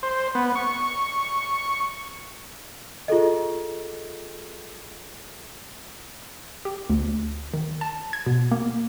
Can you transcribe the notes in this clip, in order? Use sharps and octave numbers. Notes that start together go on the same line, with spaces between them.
C5
B3
C#6
F4 G#4 A4 D#5
G4
D2
D#3
A5
G#6
B2
A#3